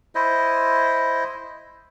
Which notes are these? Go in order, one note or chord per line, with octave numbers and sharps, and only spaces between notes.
E4 C5 D#5